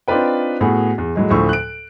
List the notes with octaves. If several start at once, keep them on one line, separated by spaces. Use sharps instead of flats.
C4 D4 D#4 F4 B4 G5
A2 B3 F#4 G#4
E2
A2 F#3 G#3
D2 A2 F3 C#6 E6
F#6 D7